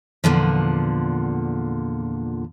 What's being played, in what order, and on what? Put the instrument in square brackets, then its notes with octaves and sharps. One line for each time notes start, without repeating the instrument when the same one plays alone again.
[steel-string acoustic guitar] E2 A#2 D3 F3